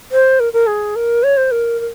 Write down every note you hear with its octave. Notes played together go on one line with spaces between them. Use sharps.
C5
A#4
A#4
G#4
A#4
C#5
C5
A#4
A#4